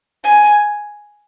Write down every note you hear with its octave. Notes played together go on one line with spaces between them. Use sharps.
G#5